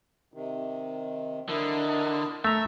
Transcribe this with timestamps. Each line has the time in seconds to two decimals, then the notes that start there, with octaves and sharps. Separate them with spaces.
0.34 C3 D#3
1.49 D3 E4 A#4 D#5
2.45 A3 E5 A#5